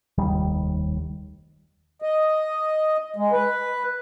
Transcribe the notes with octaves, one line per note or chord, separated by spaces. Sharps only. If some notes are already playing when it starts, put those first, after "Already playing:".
F1 D#2 D#3 G3
D#5
G#3
B4